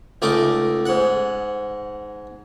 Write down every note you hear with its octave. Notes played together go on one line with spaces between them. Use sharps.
C#2 A3 D#4 A#4 D6
G#2 F#5